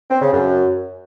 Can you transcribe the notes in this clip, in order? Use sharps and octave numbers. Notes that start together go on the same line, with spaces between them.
C4
C#3
F#2